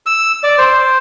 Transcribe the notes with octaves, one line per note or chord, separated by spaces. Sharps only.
E6
D5
C5